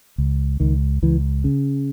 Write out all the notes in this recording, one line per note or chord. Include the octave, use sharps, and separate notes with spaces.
C#2
C#2 D#3
C#2 E3
C#3